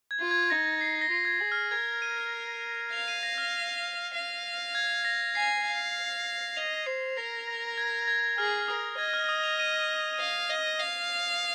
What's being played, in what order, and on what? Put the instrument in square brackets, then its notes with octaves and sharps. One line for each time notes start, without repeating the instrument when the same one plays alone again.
[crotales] G#6
[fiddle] F4
[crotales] G#6
[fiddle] D#4 [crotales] A#6
[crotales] C7
A#6
[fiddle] F4 [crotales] C7
[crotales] G#6
A#6
[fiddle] G#4
[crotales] F6
[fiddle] A#4 [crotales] G#6
[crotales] D#7
[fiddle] F5 [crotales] F7
[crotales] D#7
A#6
F6
[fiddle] F5
[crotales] G#6
A#6
[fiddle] G#5 [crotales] C7
[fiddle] F5
[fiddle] D#5 [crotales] F7
[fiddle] C5 [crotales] C7
[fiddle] A#4 [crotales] A#6
[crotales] A#6
G#6
A#6
G#6
[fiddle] G#4 [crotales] F6
[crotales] F6
[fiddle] A#4 [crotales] D#6
[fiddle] D#5 [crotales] G#6
[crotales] F6
D#6
F7
D#7
[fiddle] F5
D#5
F5